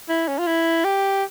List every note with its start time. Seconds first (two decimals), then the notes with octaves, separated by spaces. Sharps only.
0.09 E4
0.28 C#4
0.38 F4
0.47 E4
0.84 G4